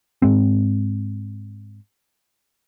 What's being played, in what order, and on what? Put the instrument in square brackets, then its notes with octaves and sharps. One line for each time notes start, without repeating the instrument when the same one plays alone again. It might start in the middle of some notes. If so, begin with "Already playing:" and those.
[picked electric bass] G#2 G#3 C4